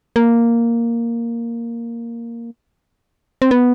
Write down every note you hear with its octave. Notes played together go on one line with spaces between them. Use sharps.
A#3
C4
B3